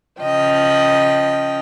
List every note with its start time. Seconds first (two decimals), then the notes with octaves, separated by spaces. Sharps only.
0.21 C#3 F3 D#5 G5